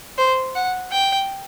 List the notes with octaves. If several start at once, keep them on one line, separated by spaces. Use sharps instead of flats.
C5
F#5
G5